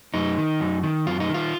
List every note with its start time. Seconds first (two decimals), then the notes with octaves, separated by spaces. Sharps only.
0.14 F#2 D#4
0.38 D#3
0.60 F#2
0.83 D#3
1.06 F#2 F4
1.20 D#4
1.29 D#3
1.34 F4